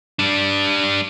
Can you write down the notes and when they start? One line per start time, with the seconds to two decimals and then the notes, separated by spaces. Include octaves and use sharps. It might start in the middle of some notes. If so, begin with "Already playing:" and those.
0.19 G3 D4